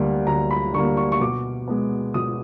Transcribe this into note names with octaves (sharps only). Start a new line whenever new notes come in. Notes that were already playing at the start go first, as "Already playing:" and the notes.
Already playing: D2 D3 G3 A#3
D2 A#5
B5
D3 G3 A#3 C#6
C#6
C#6
B2 D6
G#3 B3
B2 D#6